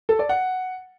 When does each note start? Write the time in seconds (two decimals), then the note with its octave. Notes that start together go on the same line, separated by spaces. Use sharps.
0.09 A4
0.19 D5
0.29 F#5